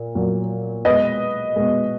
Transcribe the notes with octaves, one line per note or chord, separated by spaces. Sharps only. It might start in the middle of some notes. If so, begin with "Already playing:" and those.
Already playing: A#2
A#2 F#3
B2 G#3 B4 D#5
B2 G#3